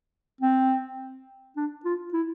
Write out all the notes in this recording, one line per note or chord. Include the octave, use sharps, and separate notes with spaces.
C4
D4
F4
E4